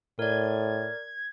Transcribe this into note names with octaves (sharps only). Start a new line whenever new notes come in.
A2 A#4 D5 G#6